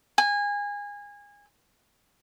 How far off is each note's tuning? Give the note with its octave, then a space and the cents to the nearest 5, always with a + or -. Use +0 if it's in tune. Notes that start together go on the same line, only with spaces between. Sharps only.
G#5 -25